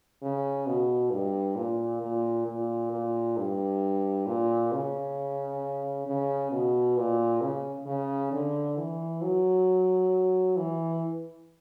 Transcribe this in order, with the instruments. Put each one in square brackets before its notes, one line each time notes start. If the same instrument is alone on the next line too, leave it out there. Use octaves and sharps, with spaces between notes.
[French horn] C#3
B2
G2
A#2
A#2
A#2
A#2
G2
A#2
C#3
C#3
B2
A#2
C#3
C#3
D3
E3
F#3
E3